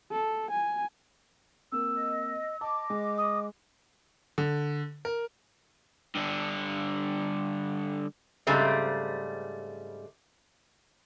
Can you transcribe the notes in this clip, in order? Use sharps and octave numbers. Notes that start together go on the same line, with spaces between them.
A4
G#5
A#3 C4 E6
D#5
D#5 A5 D6
G#3
D#6
D3
A#4
G2 D3
G#2 C#3 G3 A3 C4